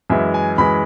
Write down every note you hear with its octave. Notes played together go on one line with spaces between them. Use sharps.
F#2 E3 G#3 E5
G#5
F#2 E3 G#3 B5